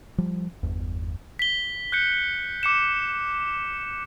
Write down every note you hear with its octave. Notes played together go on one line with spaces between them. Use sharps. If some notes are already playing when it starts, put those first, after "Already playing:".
F3 G3
G1 E2
B6 G7
F#6 G6 C#7
D6 C#7 E7